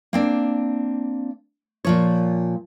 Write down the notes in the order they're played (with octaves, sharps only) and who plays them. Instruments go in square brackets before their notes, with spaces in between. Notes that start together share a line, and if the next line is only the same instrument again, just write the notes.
[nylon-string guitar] A#3 C4 D4
A#2 F3 C#5